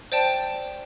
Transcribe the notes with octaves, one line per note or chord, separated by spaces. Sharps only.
C5 D5 G5 A5